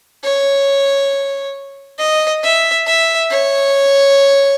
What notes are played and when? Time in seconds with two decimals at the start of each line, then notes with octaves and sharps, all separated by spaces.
0.24 C#5
1.98 D#5
2.43 E5
2.86 E5
3.30 C#5